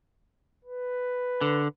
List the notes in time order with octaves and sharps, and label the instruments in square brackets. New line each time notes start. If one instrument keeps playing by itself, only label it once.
[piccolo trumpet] B4
[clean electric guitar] D3